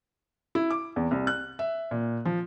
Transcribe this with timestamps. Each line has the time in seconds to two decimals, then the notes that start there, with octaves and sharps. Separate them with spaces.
0.55 E4
0.70 D6
0.96 E2
1.11 C2
1.27 F#6
1.59 E5
1.91 A#2
2.25 F3